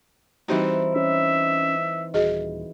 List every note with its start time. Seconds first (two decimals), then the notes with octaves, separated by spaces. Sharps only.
0.48 E3 G3 C4 D#4 F#4 G4
0.95 C#4 E5
2.14 D#1 F#4 G#4 D#5